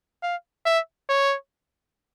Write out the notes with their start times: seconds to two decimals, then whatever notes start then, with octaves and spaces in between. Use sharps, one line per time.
0.23 F5
0.66 E5
1.09 C#5